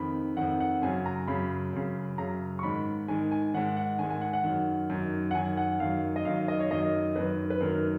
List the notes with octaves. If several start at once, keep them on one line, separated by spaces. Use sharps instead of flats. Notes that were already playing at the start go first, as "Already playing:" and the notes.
Already playing: F2 D#3 B5
F2 D#3 F#5
F#5
F#2 C#3 G#5
A#5
F#2 C#3 B5
F#2 C#3
F#2 C#3 A#5
C#6
G#2 D#3 B5
G#2 D#3 G#5
G#5
G#2 D#3 F#5
F#5
G#2 D#3 G#5
G#5
F#5
F#5
F#2 D#3
F#2 D#3
F#5
F#2 D#3 G#5
F#5
F#2 D#3 F5
D#5
F#2 D#3 F5
D#5
C#5
F#2 D#3 D#5
F#2 D#3 B4
B4
F#2 D#3 A#4